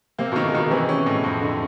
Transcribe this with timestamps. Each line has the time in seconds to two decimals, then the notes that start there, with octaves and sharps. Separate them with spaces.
0.18 C3 A#3
0.32 B2
0.36 D#3
0.46 C#3
0.55 B2 D#3
0.71 C3 E3
0.89 C#4
1.06 A2
1.24 F2
1.42 D3